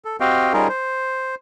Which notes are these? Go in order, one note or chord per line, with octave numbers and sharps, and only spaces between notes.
A4
C4 F#4 G4 D#5 F5 G5
G3 C#4 D#4 F4 G#4 A#4
C5